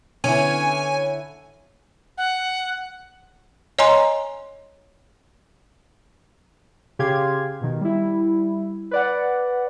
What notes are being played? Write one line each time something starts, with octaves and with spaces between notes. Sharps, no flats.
D3 B3 C#4 E4 G#5
F#5
C#5 D#5 G#5 A#5 C6
C#3 G4 G#4 F5 C6 G#6
B2 D#3
G3 E4
B4 D5 F#5